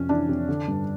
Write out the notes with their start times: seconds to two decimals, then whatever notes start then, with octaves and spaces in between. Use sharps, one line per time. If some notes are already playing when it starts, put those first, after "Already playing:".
Already playing: F2 C3 C#4
0.09 E3 D4
0.29 F2
0.49 D3
0.68 G2